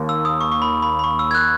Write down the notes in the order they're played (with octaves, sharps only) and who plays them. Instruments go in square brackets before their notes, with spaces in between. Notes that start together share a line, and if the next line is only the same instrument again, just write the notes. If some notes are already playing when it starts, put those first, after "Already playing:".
Already playing: [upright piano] D#2 A#3
[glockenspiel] E6
D#6
C#6
C#6
B5
B5
B5
C#6
E6
G#6
F#6